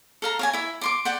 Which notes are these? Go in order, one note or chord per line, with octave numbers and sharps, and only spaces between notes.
A4 F5 A#5
C#5 F5 G#5
E4 E5
D5 C6 D6
D5 F#5 G5